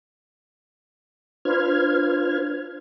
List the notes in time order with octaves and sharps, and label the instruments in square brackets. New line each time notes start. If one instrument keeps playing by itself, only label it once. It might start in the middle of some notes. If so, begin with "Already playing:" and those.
[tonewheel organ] D4 F4 B4 C5 F6 G#6